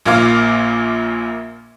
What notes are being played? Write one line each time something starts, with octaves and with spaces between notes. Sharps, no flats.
A#1 A#2 A#3 F5 D6 F6